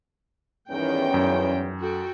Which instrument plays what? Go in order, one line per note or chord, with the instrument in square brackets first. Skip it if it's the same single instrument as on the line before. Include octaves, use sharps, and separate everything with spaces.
[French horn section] E2 G2 C#4 [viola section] D#3 G5
[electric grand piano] F#2
[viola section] F#4 A4 G5